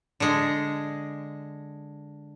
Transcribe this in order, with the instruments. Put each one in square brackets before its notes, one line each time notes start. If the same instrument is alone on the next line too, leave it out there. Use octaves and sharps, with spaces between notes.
[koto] D3 G#3